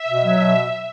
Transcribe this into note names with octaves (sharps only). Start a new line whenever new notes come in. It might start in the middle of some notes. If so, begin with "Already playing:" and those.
Already playing: E5
B2
F#3
B2